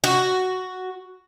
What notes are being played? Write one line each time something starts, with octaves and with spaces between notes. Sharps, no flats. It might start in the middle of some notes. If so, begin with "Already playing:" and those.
F#4